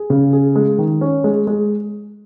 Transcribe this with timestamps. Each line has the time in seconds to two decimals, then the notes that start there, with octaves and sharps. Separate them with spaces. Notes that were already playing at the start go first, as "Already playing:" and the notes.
Already playing: G#4
0.10 C#3
0.33 G#4
0.55 G#3
0.78 D#3
1.01 C#4
1.24 G#3
1.47 G#3